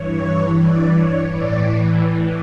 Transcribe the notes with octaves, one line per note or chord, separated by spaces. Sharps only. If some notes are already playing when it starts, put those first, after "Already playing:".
Already playing: G2 E3 C#5
D5
C#5
A2 E3 D5